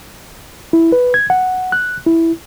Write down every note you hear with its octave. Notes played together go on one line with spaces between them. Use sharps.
E4
B4
G#6
F#5
F#6
E4